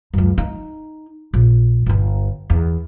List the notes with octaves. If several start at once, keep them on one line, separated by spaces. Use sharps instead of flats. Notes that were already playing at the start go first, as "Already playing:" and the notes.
C#2 F#2
D#4
A#1
G1 D3
E2